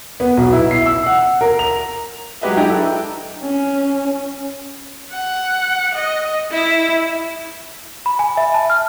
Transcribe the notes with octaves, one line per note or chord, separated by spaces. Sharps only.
B3
B1
E4
C7
E6
F#5
A#4
F7
F#3 G#3 G4 B4 D#5 E5
D4 E4 G4 D#5 G5 A#5
A4
G5
C#4
F#5
D#5
E4
B5
G#5
E5
A5
F6